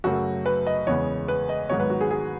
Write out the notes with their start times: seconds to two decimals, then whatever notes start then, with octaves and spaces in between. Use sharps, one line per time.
0.04 F#2 C#3 F#3 A3 F#4
0.46 B4
0.67 D#5
0.87 E2 C#3 G#3 B3 C#5
1.28 B4
1.49 D#5
1.70 G#2 D#3 F#3 B3 C#5
1.80 B4
1.90 F#4
2.01 G#4
2.11 G#4